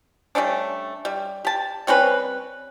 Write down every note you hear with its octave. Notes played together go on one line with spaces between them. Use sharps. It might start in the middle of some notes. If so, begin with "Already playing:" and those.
G3 A3 C#4 D4
G3
G4 A5
G3 C4 C#4 B4